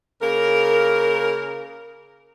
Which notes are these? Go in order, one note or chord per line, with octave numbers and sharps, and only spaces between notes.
C#3 A#3 A#4